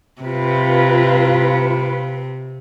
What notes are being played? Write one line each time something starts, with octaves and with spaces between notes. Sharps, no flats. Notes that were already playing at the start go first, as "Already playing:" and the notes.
C3 F4 B4